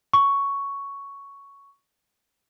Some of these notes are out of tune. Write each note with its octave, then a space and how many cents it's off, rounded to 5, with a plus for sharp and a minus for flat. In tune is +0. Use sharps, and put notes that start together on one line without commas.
C#6 +5